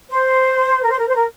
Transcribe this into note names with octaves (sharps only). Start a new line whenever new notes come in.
C5
A#4
C5
A#4
C5
A#4